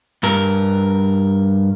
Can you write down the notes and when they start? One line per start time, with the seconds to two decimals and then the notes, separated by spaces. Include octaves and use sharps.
0.23 G2 A#4